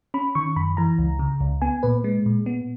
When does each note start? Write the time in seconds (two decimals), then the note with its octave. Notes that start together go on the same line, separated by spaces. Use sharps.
0.14 C#4 B5
0.35 D#3 C#6
0.56 F#2 B5
0.77 E3 A#5
0.98 C#2
1.19 C#3
1.41 C#2
1.62 B3 G#5
1.83 A#2 B4
2.04 G#3
2.26 A#2
2.46 B3